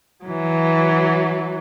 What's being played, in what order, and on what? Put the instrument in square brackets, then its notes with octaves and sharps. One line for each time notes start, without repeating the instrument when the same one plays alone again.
[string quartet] E3 F#3